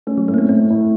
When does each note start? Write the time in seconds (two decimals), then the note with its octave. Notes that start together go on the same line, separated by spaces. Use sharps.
0.07 A3 C#4
0.18 F#3
0.28 A2 A3
0.34 A#3
0.38 C4
0.49 A2 C4
0.70 A2